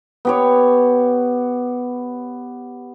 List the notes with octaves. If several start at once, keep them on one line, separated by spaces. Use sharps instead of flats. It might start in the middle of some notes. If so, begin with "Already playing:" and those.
B3 G4 C#5